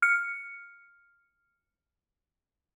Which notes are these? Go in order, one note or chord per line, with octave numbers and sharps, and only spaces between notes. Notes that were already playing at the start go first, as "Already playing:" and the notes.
F6 C#7